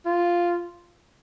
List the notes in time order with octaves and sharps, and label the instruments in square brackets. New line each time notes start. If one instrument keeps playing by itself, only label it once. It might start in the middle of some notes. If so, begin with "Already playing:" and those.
[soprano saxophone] F4